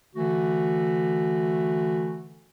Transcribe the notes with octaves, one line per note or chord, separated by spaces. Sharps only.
D3 E3 A3 F#4